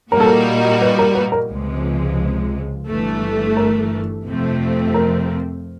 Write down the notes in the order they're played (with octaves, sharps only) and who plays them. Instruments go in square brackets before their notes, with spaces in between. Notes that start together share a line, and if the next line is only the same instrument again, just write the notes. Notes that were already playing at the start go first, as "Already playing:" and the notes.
[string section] A#2 G3 A#3 D#4 F#4 [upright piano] A#4
[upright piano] A4
A#4
B4
A#4
B4
A#4
[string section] C#2 C3 F3 G#3
G1 G2 E3 A3
[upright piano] A#4
[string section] F2 C3 F3 A3 C4
[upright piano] A#4